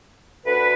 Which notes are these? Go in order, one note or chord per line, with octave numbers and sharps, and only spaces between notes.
D2 D3 B4